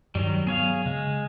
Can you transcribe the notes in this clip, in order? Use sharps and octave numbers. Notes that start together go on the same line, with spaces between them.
G2 D#3 F#3 G3
F#3 B3 G#4 C#5 F5
C#3 G#3